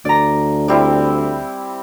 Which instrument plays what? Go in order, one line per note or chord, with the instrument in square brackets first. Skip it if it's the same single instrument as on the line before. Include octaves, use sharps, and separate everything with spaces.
[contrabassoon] D2 [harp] D5 A#5
[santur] G3 C4 E4